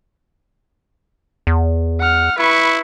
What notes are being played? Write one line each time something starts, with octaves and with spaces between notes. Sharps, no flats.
E2
F#5 F6
E4 B4 C#6